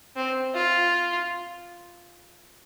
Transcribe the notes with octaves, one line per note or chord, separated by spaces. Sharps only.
C4
F4